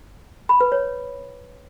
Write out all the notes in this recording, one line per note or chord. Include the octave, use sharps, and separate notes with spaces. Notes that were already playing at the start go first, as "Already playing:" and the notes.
B5
B4
C#5